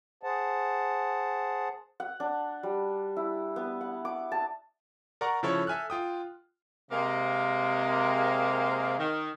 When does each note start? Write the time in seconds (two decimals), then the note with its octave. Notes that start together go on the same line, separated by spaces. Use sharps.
0.23 G#4 C5 F#5 A5
2.00 F#5
2.20 D4
2.63 G3
3.16 E4
3.56 B3
3.81 F#5
4.05 D6
4.32 A5
5.21 A#4 D5 F#5 A#5 C#6
5.43 C#3 F3 E4 A4 C#5
5.67 A4 E5 G#5 F6 F#6
5.90 F4 G5 D#6
6.90 C3 G#3 A#3
8.98 D#3